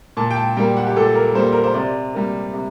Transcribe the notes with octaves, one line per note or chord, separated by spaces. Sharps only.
A#2 A5
G5
A5
G3 A#3 G5
F#5
G4
A#2 A4
A#4
G3 A#3 C5
A#4
C5
C3 D5
G3 A#3
C3